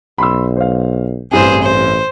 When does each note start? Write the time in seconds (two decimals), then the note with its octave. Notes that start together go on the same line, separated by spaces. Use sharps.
0.18 B1 B5 C6 E6
0.57 C5 F5
1.32 A1 G2 C3 E3 G#4 C5
1.62 C5